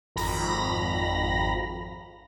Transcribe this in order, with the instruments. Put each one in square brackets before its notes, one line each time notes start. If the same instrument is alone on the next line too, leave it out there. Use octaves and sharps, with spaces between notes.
[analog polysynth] G#1 F2 A#5 B5 A#6